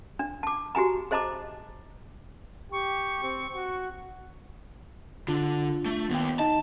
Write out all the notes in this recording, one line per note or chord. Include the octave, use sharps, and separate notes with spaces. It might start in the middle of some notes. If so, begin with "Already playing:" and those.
D4
A5 D6
F#4 G4 G#5 A#5
G#4 C5 D#5 A5 A#5 D6
G4 C#6
C4
F#4
D3 D4 F4
A3
D#2 B3 G5
D#4 D#5 A5